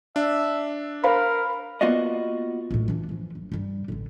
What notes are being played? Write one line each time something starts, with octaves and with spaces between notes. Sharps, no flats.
D4 E5
A#4 C5 F5 B5
A#3 B3 F4 F#4 D5 D#5
A#1 A2
E3 D4
E3 F3
F#1
G2 G3
A1 D3